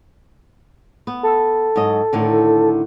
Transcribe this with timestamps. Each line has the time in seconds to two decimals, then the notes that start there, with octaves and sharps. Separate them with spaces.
1.07 B3
1.23 A4
1.76 G#2 F#3 D#5
2.13 A2 D3 D#3